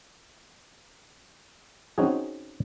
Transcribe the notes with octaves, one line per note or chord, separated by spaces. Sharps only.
C4 C#4 D#4 F#4 G#4